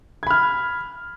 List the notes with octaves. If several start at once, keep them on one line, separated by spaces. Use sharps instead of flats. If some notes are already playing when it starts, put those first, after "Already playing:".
B5 F6 G#6